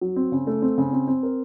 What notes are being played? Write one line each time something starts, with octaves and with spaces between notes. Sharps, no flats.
F#3
C4
C#3
A3
C4
C#3
C4
C4
A#4